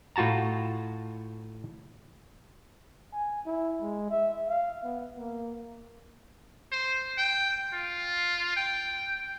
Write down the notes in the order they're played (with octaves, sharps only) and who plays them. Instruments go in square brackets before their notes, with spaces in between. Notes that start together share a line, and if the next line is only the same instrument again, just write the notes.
[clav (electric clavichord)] A2 F4 F#4 A5 A#5
[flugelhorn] G#5
E4
G#3
E5
F5
B3
A#3
[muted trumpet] C5
G5
F4
G5